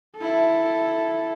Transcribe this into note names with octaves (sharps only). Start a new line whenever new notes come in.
E4 A4